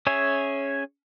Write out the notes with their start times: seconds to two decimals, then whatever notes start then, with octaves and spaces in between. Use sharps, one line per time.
0.07 C#4 G#4 C#5 E5